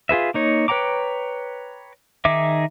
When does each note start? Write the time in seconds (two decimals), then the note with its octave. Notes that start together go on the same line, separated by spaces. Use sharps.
0.09 F4 G#4 B4 E5
0.34 A#3 D#4 C#5
0.68 B4 C#5 G5 A#5 D6
2.25 D#3 D#4 G#4 E5 D6